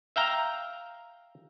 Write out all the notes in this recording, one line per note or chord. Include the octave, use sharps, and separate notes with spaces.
E5 F5 G5 A#5